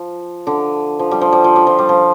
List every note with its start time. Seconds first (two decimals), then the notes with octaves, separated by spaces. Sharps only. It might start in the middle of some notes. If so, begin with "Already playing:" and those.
Already playing: F3
0.47 D3
0.99 F3
1.11 G3
1.21 F3
1.33 G3
1.44 F3
1.56 G3
1.67 F3
1.78 G3
1.89 F3